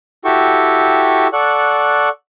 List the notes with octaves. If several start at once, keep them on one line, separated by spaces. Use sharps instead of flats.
E4 F#4 G4 A4 G5 C#6
A4 D5 F#5 C#6 F#6